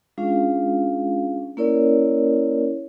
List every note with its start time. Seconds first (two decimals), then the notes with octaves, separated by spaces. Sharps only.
0.18 G#3 C#4 D4 F4 G#4 F5
1.57 A#3 C#4 E4 A#4 C#5 D5